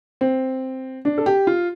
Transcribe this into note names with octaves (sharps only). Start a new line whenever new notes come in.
C4
D4
A4
G4
F4